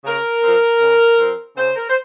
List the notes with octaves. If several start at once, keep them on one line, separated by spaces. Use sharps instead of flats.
C#3 A#4
F3 C4
C#3
F3 C4
C#3 C5
A#4
C5